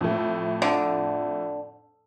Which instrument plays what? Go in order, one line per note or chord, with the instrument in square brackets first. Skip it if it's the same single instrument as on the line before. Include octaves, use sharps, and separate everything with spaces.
[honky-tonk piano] F2 A2 A3
[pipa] D3